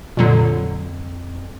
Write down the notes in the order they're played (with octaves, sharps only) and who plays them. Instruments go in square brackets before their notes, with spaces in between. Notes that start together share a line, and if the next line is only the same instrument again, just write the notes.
[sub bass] F2 [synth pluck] A#2 D3 F#3